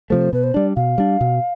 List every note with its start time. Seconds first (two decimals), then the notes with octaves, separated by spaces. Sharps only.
0.10 C3 F3 A3 C5
0.33 B2 B4
0.44 C5
0.54 G3 D4 D5
0.76 B2 F5
0.98 G3 D4
1.21 B2